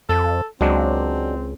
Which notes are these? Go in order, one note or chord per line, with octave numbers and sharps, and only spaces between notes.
F2 A4
C#2 F#3 G#3 C4 D4